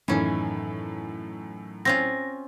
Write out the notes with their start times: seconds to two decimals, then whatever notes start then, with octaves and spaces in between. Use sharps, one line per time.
0.08 F#2 A2 D#3 E3 C#4
1.85 C4 C#4 F4 A#6